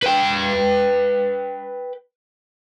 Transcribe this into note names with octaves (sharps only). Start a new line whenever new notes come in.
B4 G5